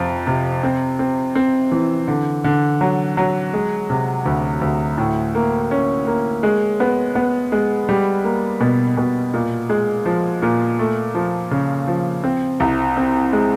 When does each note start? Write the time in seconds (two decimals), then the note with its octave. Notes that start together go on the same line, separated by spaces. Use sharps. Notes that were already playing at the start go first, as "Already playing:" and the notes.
Already playing: F2 C3 F3
0.27 C3
0.63 C4
0.99 C4
1.35 C4
1.72 E3
2.08 D3
2.44 D3
2.81 F#3
3.17 F#3
3.53 G#3
3.90 C3
4.26 D2
4.61 D2
4.98 A2
5.35 A#3
5.71 C#4
6.07 A#3
6.43 G#3
6.80 B3
7.15 B3
7.52 G#3
7.89 G3
8.24 A#3
8.61 B2
8.97 B2
9.34 A#2
9.69 G#3
10.06 F3
10.42 A#2
10.79 A3
11.15 F3
11.51 C#3
11.88 F3
12.24 C4
12.60 C2
12.97 C4
13.33 G#3